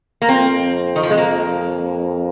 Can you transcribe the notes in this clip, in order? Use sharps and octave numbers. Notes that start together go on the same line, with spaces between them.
A#3
F2 C4
D#3
F3
G#3
A#3